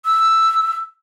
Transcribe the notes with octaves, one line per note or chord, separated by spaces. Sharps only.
E6